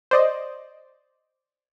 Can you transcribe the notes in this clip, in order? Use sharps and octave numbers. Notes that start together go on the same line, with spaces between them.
C5 D5 D#5